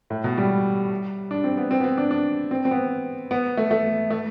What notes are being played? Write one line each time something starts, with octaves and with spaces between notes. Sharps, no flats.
A2
B2
G3
D4
C4
B3
C4
B3
C4
D4
D4
C4
C4
B3
B3
A3
A3
A3